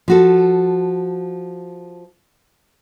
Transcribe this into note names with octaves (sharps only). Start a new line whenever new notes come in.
F3 F#4 A4